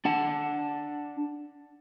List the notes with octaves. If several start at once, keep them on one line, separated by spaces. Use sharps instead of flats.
D4 F#5 A5